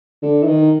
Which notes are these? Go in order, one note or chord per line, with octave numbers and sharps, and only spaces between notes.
D3
E3
D#3